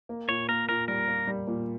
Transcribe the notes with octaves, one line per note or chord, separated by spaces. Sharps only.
A#3
A#2 C#5
A#3 A#4
A#2 A#4
G3 A#4
A#3
G3
A#2